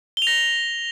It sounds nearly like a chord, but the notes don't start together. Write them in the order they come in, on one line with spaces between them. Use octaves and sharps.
G7 F7 A#6